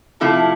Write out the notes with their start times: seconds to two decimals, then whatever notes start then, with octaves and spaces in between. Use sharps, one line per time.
0.20 C3 F3 A3 E4 A5